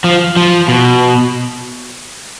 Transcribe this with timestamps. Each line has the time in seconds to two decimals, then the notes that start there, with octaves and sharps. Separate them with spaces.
0.04 F3
0.36 F3
0.68 B2